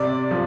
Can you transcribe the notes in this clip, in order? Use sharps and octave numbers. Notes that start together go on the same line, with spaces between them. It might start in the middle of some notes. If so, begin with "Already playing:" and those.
Already playing: C3 D5
F3